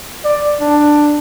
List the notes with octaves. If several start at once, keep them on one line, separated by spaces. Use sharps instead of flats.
D5
D4